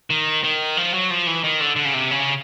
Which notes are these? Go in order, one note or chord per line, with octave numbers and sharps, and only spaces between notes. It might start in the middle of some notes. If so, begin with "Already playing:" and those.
D#3
D#3
F3
F#3
F3
E3
D#3
D3
D3
C#3
C3
C#3